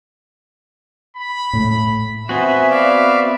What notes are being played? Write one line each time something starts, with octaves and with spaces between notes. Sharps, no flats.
B5
A2 A3
B3 C4 F#4 E5 G#5 B5
D5 F5